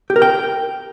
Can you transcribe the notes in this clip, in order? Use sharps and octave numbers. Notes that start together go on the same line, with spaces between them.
G4
A#4
G5